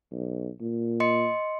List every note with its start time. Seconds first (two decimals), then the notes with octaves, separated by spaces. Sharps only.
0.12 B1
0.61 A#2
1.00 D#5 C6 C#7